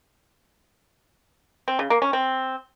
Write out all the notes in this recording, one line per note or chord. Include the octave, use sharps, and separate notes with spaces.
C4
C#3
A#3
C#4
C4